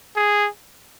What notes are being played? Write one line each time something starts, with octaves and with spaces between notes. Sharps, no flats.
G#4